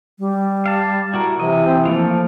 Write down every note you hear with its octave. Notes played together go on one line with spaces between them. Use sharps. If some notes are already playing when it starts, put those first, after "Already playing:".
G3
F5 A5
E4 F#4 A#4
C3 E3 D#5
C4
F3 A3 A#3 F4